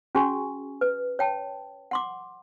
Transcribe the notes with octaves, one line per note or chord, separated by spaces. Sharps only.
C#4 F#4 G#4 G#5 C#6
B4
C#5 G5 A5
F#5 C6 D6